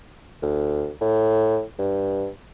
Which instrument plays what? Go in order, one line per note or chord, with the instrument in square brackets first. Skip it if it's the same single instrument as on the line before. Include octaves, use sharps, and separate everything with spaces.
[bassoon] D2
A2
G2